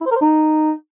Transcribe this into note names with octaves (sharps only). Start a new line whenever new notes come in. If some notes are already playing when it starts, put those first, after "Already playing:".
E4
C5
A#4
C5
D#4